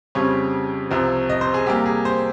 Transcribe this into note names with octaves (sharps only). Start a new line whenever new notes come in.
F2 C#3 G3 C4 C#5
C2 C3 F3 C4
D#5
C5
G#4
C3 G3 A#3 G4
G#4
C5